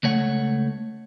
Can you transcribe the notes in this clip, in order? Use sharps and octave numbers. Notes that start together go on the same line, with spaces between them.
C#2 A3 C#5 F#5